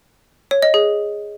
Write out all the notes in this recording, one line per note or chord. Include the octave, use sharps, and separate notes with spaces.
C#5
D#5
G#4